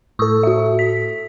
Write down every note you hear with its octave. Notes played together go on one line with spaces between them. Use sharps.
A2 A4 C#6 D#6 E6
F#4 E5
B6